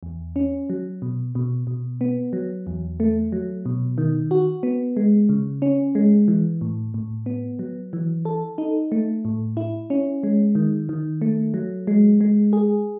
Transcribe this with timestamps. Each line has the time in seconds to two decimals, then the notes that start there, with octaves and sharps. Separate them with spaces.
0.03 E2
0.36 C#4
0.70 F#3
1.02 B2
1.35 B2
1.67 B2
2.01 B3
2.33 F#3
2.67 E2
3.00 A3
3.32 F#3
3.66 B2
3.98 D#3
4.31 F#4
4.63 B3
4.97 G#3
5.29 C#3
5.62 C#4
5.95 G#3
6.28 E3
6.61 A2
6.94 A2
7.26 B3
7.59 F#3
7.93 E3
8.25 A4
8.58 D#4
8.92 A3
9.25 A2
9.57 E4
9.90 C#4
10.23 G#3
10.55 D#3
10.89 D#3
11.21 A3
11.54 F#3
11.87 G#3
12.21 G#3
12.53 G#4